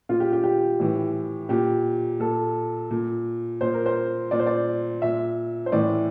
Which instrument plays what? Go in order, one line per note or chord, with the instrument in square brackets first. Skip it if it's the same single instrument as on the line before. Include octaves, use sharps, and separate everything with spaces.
[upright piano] A#2 F4
G4
G4
G4
A2 E3
A#2 G4
A#2 A4
A#2
A#2 C5
A#4
C5
A#2 D5
C5
D5
A#2 E5
C5
A2 E3 D5